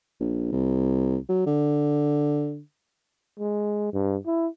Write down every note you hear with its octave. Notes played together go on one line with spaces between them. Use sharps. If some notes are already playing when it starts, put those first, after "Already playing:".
A#1
C2
F#3
D3
G#3
G2
E4